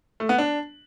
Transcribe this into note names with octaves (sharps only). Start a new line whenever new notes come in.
A3
B3
D4